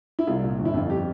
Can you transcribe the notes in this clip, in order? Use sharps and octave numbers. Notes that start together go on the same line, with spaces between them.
E4
C2 F4
A#2
G1
E4
F2 F4
G4